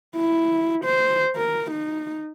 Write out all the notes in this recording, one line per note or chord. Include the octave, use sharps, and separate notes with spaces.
E4
C5
A#4
D#4